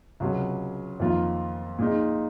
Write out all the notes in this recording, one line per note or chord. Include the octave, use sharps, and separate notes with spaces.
C#2 C3 F#3
F2 D#3 A#3 F4
A#2 G#3 D#4